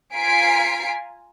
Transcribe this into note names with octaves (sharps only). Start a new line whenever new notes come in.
F4 G#5 A#5 B6 C7 D7